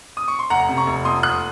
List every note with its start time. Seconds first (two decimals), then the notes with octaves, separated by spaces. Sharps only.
0.17 D#6
0.28 C#6
0.39 C6
0.50 F1 F#5 A#5
0.68 C3
0.77 A#5 C#6
0.87 F1
1.05 F2 C6 D#6
1.23 F1 D#6 F#6